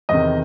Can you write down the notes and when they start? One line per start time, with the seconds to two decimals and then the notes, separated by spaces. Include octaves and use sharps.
0.09 E2 C3 D#3 D#5